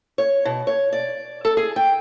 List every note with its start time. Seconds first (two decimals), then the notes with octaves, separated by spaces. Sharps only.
0.18 C#5
0.45 B2
0.67 C#5
0.93 D5
1.45 A4
1.57 G#4
1.76 G5